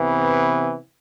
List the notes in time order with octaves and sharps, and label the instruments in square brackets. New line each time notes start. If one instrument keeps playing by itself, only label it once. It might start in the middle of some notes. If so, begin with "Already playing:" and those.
Already playing: [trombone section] C3 E3 B3